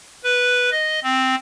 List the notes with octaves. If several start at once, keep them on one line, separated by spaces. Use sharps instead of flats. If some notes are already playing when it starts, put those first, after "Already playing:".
B4
D#5
C4